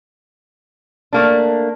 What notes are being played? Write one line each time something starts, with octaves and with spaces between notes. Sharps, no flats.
A3 A#3 D4